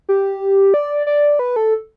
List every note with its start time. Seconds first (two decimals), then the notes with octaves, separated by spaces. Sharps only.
0.09 G4
0.74 D5
1.07 D5
1.39 B4
1.56 A4